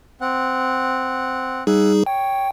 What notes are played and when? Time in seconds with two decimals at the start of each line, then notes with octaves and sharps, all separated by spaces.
0.21 C4 F#5
1.67 G3 D#4 G#4 E5 F#5 G#5
2.06 C#5 G5